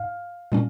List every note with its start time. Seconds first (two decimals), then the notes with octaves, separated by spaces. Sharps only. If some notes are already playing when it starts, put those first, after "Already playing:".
Already playing: G#2 F5
0.52 A#2 G3 C#4